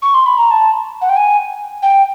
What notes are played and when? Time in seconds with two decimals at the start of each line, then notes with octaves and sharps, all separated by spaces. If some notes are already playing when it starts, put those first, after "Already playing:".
0.02 C#6
0.14 C6
0.26 B5
0.37 A#5
0.50 A5
1.01 F#5
1.09 G5
1.16 G#5
1.82 G5